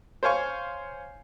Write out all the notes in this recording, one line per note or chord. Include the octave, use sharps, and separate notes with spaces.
C5 C#5 F5 G#5 C#6